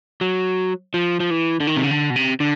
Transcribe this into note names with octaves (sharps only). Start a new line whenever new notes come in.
F#3
F3
F3
E3
D3
D#3
C3
C#3
D3
B2
C3
D3